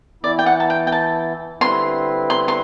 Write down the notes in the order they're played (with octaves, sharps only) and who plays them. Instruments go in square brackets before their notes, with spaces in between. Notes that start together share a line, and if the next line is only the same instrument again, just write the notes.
[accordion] E3 B3 E4 [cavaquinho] D5
[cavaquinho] G5
F#5
A5
G5
G5
A5
[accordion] D3 G3 C4 E4 B4 [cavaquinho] C6
[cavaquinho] C6
C6